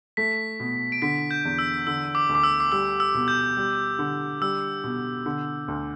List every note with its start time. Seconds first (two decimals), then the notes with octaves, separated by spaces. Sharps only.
0.17 A3 B6
0.60 B2
0.92 D7
1.02 D3 B6
1.31 G6
1.45 E2
1.59 E6
1.87 D3 E6
2.15 D6
2.29 D2
2.35 D6
2.44 E6
2.60 D6
2.72 G3 E6
3.00 E6
3.14 B2
3.28 G6
3.57 G3
3.99 D3
4.41 G3 E6
4.84 B2
5.26 D3
5.68 D2